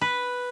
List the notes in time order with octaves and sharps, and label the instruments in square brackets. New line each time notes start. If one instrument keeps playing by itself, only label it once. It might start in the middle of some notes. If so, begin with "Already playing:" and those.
[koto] B4